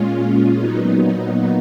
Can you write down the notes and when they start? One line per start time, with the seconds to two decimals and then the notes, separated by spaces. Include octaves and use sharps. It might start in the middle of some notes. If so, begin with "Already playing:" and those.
Already playing: A#2 G#3 C#4 F4
0.59 A#2 F#3 B3 D#4